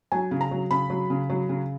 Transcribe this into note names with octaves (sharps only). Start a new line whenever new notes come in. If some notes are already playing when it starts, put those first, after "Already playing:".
F#3 G#5
C#3
A#5
F#3
C#3 B5
F#3
C#3
F#3
C#3